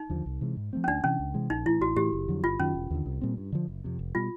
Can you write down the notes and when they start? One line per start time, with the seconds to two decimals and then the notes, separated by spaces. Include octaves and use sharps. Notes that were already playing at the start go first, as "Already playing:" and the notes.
Already playing: D#4
0.10 D#2 D3 F3
0.26 C2
0.41 C3 E3 G#3
0.57 G#2
0.73 F3 A3 C4
0.84 C#4
0.88 D2 D4
1.04 C3 E3 C#4
1.20 C#2
1.34 C3 E3 G#3
1.50 A#1 D#4
1.65 A2 E3 E4
1.81 A1 F#4
1.96 A2 E3 G4
2.13 F#1
2.28 F2 D3 F#3
2.43 G1 F4
2.59 F#2 D#3 F#3 C#4
2.75 E1
2.91 D#2 D3
3.06 C2
3.21 A#2 G3 C4
3.37 G2
3.52 D3 F3
3.68 F#1
3.84 F2 C3
3.99 F1
4.15 B2 G3 F4